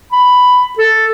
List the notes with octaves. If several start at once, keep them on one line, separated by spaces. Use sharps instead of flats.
B5
A4